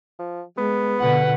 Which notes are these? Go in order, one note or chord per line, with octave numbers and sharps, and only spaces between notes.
F3
G#3 B3
B2 D3 B4 F#5